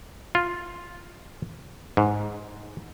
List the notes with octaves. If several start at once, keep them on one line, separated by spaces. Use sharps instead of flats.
F4
G#2